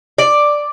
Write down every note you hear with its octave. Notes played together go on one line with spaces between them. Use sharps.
D5